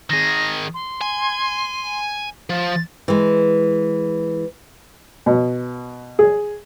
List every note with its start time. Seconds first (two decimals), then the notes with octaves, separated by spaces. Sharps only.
0.10 D#3 G#4 A#6
0.74 C6
1.01 G#5
2.50 F3 A6
3.08 E3 G#3
5.26 B2
6.19 G#4